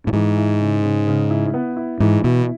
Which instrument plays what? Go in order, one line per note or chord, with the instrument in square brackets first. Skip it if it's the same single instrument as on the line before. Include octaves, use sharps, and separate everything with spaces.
[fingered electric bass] A2
[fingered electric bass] G#2 [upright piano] E3
[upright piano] E4
C#3
C#3
C#3
E4
B3
E4
[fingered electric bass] G#2 [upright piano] E3
[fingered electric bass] B2 [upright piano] E4